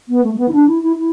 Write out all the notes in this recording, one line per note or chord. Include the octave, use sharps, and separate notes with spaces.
B3
A3
A3
B3
E4
D4
E4
E4
E4